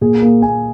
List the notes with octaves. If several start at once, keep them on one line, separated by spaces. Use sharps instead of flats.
A#2 G#4
A#3
A#3 G#5